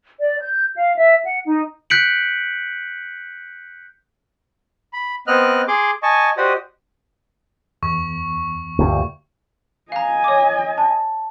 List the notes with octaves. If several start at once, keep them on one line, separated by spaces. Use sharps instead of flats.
D5
G6
F5
E5
F#5
D#4
F#6 G6 B6 C#7 D7 F#7
B5
B3 C4 D#5 F6 F#6
G#4 C6 D6
D#5 G#5 A5 C#6
F#4 G4 C5 D5 D#5 D#6
E2 C#6
D2 G2 A#2
D#5 F5 G#5 A#5
C#5 D6
A5